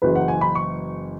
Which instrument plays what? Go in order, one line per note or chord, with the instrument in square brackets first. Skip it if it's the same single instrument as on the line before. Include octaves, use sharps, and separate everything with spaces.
[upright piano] F#1 F#2 E3 B4
F#5
G#5
B5
C#6